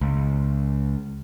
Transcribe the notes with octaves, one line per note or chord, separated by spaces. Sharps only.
C#2